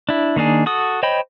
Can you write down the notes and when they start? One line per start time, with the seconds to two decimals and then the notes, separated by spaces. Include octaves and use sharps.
0.09 D4 E4
0.36 D#3 A#3 D4 G#4
0.66 F#4 A4 D#6
1.03 C5 C#5 D#5 G5 B5